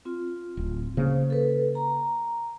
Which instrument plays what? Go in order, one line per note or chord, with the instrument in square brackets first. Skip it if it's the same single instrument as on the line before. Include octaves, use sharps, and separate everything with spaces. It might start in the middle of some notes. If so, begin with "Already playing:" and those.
[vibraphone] C4 F4
[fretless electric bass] D1
[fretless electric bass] C#3 A#3 [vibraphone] C5
[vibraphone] A4 B4
A#5